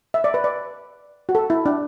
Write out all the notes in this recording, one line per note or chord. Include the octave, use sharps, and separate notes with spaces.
E5
D5
B4
D5
F#4
A4
E4
D4